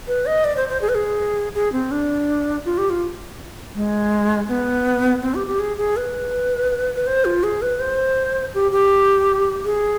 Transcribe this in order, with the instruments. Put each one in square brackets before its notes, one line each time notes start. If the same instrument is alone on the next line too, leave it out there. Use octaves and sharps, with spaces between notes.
[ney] B4
D#5
D5
C5
C5
G#4
B4
G#4
G#4
C4
D4
F4
G4
F4
G#3
B3
C4
G4
G4
G#4
G#4
B4
B4
C5
F4
G#4
B4
C5
G4
G4
G#4